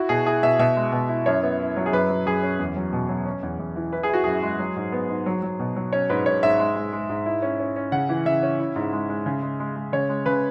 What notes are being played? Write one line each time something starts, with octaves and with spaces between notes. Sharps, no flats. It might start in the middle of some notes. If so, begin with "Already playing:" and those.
Already playing: E4 F#4
B2 G#4
E4 G#4
B2 E5
B2 E5
G#3
B2
E4
F#2 C#5
B3
E4
F#3
G#4
F#2 B4
F#3
F#2 G#4
C#4
E2
F#3
B2
F#3
C#4
E2
E2
E3
E4 B4
G#4
E4 F#4
F#2 G#4
G#3
F#3
G#2
B3
G#2
F#3
F#3
B2
F#3
C#4 C#5
G#2 B4
G#2 C#5
G#2 E5
G#3
G#3
G#3
G#2
E4
C#4
C#4
C#4
C#3 F#5
E3
C#3 E5
C#4
E4
G#2
G#3
G#3
C#3
G#3
G#3
G#3
C#3 C#5
G#3
C#3 B4